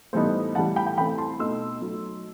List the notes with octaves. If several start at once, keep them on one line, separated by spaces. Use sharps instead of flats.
A2 E3 G3 B3 D#4 A4 C5
A2 E3 G3 F#5 A5
G5 B5
G5 B5
E3 A3 C4 G5 B5
A5 C6
B2 A3 D#4 C6 E6
F#3 A3 D#4